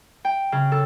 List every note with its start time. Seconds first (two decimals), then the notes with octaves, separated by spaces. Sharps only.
0.25 G5
0.52 C#3
0.72 A4